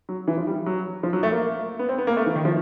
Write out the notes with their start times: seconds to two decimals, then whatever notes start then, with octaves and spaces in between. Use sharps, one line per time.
0.09 F#3
0.28 E3
0.37 F3
0.47 G3
0.66 F#3
1.03 F3
1.13 F#3
1.23 A3
1.32 A#3
1.79 B3
1.89 C4
1.98 B3
2.07 A#3
2.17 A3
2.26 E3
2.36 D#3
2.45 F3